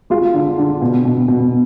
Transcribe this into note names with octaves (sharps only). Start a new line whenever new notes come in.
G#3 F4
D3
D3
B2
B2
B2